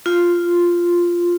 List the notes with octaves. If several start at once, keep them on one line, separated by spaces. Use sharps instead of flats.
F4